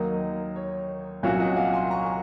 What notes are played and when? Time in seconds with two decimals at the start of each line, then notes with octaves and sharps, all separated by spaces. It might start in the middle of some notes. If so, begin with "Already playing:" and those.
Already playing: D#2 D#3 F#3 A#3 D#4 D#5
0.56 C#5
1.23 C2 A#2 F#3 C#4 F#4 C#5 F5
1.40 D#5 F#5
1.50 F#5
1.56 F5 G#5
1.73 G#5 C6
1.90 A#5 C#6